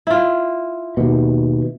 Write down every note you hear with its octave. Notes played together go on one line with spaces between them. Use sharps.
E4 F4
D#2 B2